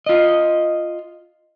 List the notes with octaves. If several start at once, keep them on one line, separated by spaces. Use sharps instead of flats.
F4 D#5